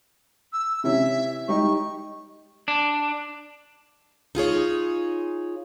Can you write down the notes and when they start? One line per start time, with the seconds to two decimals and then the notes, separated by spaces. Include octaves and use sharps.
0.53 E6
0.84 C3 E3 C#4 E5
1.48 G3 D#4 G4 C#6
2.68 D4
4.35 D#4 F4 G#4 C#5